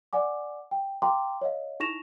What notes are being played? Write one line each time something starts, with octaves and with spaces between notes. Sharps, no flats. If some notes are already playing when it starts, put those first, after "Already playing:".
D5 F#5 G#5 D6
G5
F5 G5 A#5 C6 D6
C#5 D#5 F5
D#4 E4 C#6 A#6 E7 F7